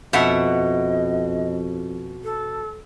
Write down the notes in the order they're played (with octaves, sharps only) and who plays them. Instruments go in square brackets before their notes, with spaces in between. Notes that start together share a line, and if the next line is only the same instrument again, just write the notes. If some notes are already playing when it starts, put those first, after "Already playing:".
[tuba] F2 [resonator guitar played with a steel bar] B2 E5 F#5 [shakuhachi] D#5
[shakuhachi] A4